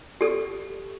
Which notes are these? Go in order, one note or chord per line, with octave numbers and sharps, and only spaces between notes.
G4 A4